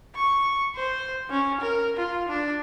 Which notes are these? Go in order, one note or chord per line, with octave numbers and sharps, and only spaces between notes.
C#6
C5
C#4
A#4
F4
D4